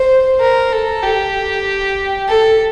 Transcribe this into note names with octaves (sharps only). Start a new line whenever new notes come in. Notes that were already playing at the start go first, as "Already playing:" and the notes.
Already playing: C5
A#4
A4
G4
A4